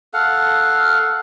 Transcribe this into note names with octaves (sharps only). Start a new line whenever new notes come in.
A4 F5 F#5